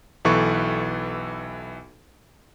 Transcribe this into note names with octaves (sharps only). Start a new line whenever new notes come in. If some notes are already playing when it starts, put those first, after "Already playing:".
B1 E3 A4 B4 C#6